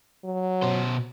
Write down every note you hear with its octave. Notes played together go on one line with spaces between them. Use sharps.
F#3
B2 C5